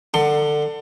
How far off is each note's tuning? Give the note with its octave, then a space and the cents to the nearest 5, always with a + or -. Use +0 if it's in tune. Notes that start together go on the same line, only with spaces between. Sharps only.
D3 +20 A5 +30 C6 +0